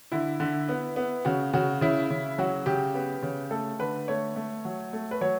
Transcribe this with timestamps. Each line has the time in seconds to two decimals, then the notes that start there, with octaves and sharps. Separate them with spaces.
0.12 D3 E4
0.40 D3
0.69 B3
0.96 B3
1.25 C#3 F#4
1.53 C#3 F#4
1.81 C#3 E4
2.10 C#3
2.38 F#3 F#4
2.66 C#3 G4
2.94 B3
3.23 C#3
3.51 A3 A4
3.79 D3 B4
4.08 A3 C#5
4.36 A3
4.65 F#3
4.93 A3
5.11 B4
5.21 F#3 C#5